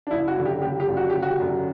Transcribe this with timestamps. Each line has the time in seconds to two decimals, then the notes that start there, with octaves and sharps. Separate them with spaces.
0.07 D4
0.11 F#1 E4
0.28 F#4
0.37 F#2 D3
0.45 G4
0.62 F#1 G4
0.80 G4
0.88 F#2 D3
0.97 F#4
1.10 F#1 G4
1.22 F#4
1.40 F#2 D3